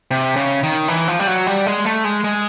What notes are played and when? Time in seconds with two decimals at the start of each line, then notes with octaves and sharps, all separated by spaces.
0.11 C3
0.36 C#3
0.63 D#3
0.88 E3
1.08 F3
1.20 G3
1.27 F#3
1.47 G3
1.66 G#3
1.86 A3
2.05 G#3
2.24 G#3